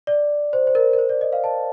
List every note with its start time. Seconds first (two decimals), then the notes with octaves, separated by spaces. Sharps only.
0.07 D5
0.53 C5
0.67 C5
0.75 A#4
0.93 A#4
0.98 C5
1.09 D5
1.21 D#5
1.33 F5
1.44 A5